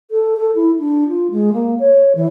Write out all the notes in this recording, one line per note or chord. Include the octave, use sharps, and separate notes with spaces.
A4
A4
E4
D4
F4
G#3
A#3
C#5
E3